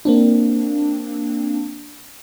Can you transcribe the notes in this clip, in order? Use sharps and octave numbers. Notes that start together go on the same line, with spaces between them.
A#3 C4 D4